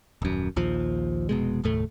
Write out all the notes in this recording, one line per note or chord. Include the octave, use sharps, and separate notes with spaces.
D#1 F#2
A#1 D#2 F3
F1 B2 G#3
F#1 D#2 A2 A3